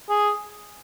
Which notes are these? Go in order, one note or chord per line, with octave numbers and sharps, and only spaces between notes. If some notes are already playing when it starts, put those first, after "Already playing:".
G#4